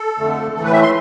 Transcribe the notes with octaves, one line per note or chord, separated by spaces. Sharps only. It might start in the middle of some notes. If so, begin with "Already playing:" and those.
Already playing: A4
F2 D3 A3
A2 E3 A3 A4
B4
E5
C6